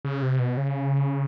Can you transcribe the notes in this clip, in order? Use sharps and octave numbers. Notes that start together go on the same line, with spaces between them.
C#3
C3
B2
C#3